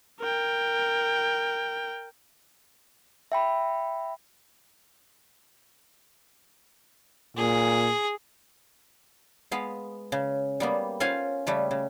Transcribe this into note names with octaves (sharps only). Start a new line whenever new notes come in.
A#4 G5
E5 G5 B5
A#2 G#4
G#3 B3 F5
C#3
G3 A#3 B3
C#4 F4 C5 F5 F#5 G#5
C#3 G3 A3
C#3